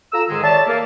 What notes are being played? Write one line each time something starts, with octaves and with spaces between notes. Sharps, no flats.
F4 A4 A#5 E6
G#2 D#3 G#3
C#5 D5 E5 A5
A#3